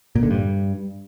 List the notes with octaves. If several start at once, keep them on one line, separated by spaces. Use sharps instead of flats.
A#2
D3
G2